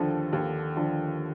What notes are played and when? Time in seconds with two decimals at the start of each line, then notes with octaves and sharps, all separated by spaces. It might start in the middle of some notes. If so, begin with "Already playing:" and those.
Already playing: D#2 D3 F3 A4
0.33 D#2
0.76 D3 F3